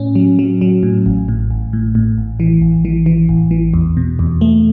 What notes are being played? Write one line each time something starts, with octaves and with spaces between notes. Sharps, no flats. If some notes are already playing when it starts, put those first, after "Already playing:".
Already playing: A2 C#4
F#3
F#3
F#3
A2
A1
A2
A1
A2
A2
A1
E3
A1
E3
E3
A1
E3
E2
B2
E2
A3